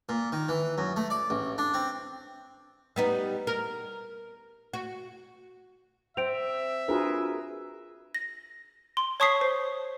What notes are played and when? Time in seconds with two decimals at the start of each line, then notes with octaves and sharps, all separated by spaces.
0.09 A#2
0.32 D#3
0.49 E3
0.78 F#2
0.96 A3
1.10 D5
1.30 A1
1.58 D4
1.74 C4
2.96 G3 B3 D#4
3.47 A#4
4.74 F#4
6.17 C4 E5 D7 F7
6.88 D4 F4 F#4 G#4 A#4 B4
8.15 A#6
8.97 C6
9.20 C#5 A5 C#6 D#6 B6 C7
9.41 C5